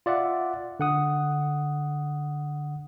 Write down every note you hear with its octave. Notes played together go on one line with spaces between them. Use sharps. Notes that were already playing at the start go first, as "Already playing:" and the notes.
F4 D5 E5 F#5
D3 F#5 D#6